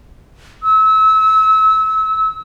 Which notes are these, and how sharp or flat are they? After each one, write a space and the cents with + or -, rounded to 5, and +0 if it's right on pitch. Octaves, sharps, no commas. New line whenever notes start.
E6 -30